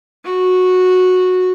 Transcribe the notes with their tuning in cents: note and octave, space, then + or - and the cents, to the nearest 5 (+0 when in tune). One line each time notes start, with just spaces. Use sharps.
F#4 -10